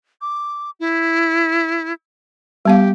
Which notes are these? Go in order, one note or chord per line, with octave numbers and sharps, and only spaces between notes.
D6
E4
G3 B3 G4 F5